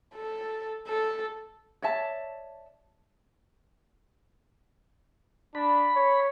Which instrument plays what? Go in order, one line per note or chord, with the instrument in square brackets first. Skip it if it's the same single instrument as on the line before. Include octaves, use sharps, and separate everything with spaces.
[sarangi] A4
A4
[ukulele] C#5 D5 E5 A5
[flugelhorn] D4 [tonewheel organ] B5
[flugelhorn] C#5